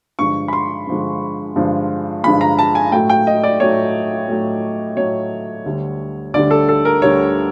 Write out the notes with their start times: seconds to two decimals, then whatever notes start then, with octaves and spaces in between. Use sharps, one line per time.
0.19 G2 D3 F3 G#3 C#6
0.48 B5
0.53 C6
0.87 G2 D3 F3 G#3
1.56 G2 D3 F3 G#3
2.24 G2 D3 F3 G#3 B5
2.41 A#5
2.59 A5
2.75 G#5
2.92 A2 F#3 A3 G5
3.10 G5
3.27 D#5
3.44 D5
3.60 A2 F#3 A3 C#5
4.29 A2 F#3 A3
4.97 A2 F#3 A3 C#5
5.66 D2 D3 G3
6.34 D2 D3 G3 D5
6.51 A4
6.69 A4
6.85 A#4
7.02 D2 D3 G3 C#5